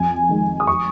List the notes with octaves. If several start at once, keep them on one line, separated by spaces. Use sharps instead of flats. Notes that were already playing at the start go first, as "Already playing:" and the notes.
Already playing: F2 G#5
D#3 G#3
D#6
C#6